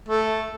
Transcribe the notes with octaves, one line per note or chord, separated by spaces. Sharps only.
A3